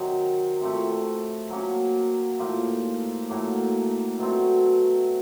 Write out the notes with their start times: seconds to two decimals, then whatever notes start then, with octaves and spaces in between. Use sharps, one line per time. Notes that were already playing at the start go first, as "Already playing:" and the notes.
Already playing: C3 D#3 F#3
0.61 C3 F3 A3
1.50 F#3 A#3 C#4
2.39 A2 F3 A#3
3.29 A2 F#3 A#3
4.19 B2 F#3 A3 C4